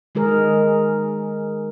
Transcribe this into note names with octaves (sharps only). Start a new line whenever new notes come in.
D#3 G#3 G#4 A#4